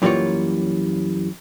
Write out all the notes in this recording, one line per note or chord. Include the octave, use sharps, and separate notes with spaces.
F#2 E3 G3 A#3 F4 C#5